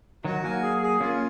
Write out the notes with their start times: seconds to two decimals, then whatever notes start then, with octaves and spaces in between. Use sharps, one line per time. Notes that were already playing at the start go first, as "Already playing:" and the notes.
0.24 D#3 F#3 F#4
0.44 F#3 A#3 G#5
0.62 G#4
0.82 G#4
1.01 A#3 C#4 F4